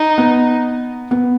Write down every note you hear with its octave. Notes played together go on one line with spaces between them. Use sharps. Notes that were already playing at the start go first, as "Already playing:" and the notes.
Already playing: D#4
B3
B3